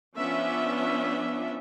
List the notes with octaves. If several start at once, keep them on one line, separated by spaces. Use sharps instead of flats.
F3 B3 C#4 D4 E5